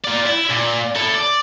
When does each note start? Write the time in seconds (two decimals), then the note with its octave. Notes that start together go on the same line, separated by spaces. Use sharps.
0.05 F4 D5
0.27 E4
0.50 A#2
0.96 E4 A4
1.15 D5